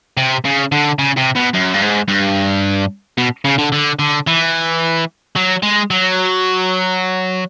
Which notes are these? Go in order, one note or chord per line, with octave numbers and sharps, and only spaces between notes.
C3
C#3
D3
C#3
C3
B2
F#2
G2
G#2
G2
B2
C#3
D3
D3
D3
E3
F#3
G#3
F#3